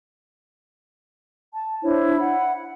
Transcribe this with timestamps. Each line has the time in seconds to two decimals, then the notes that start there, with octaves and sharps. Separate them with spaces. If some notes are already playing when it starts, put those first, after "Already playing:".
1.54 A5
1.84 D4 E4 C5 C#5
2.17 F#5 B5